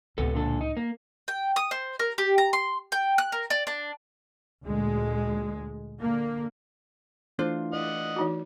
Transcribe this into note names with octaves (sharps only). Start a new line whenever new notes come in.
C#2 A2 C3 B3 A4
A#2 D3 A4
D#4
A#3
G5
D#6
C5
A#4
G4
A#5
C6
G5
F#6
A#4
D5
D4
D2 A#2 G#3
D3 A#3
E3 A3 D4 F4 C5
D5 D#5 F#5
E3 D#4 F#4